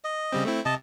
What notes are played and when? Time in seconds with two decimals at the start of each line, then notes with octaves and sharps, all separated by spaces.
0.04 D#5
0.32 C#3 G3 C4
0.45 A3 C4 E4
0.65 C3 D#5 A5